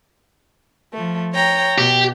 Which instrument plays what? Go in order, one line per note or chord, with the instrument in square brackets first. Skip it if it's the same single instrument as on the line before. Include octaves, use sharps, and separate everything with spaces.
[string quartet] F3 A3
C#5 G5 A#5
[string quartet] B2 [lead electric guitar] G4